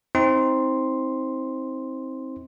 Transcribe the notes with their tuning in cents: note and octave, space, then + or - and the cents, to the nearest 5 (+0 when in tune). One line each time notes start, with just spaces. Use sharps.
C4 +10 D#4 +35 C6 +0